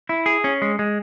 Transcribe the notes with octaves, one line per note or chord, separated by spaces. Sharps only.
E4
G#4
C#4
G#3
G#3